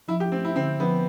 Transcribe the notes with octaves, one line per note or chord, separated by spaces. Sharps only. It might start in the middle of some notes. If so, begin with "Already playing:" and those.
F3 E4
G4
A3 C4
E4
D3 C4
F3 B3